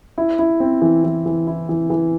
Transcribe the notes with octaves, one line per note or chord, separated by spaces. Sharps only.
E4
E4
C4
E3
E3
E3
E4
E3
E3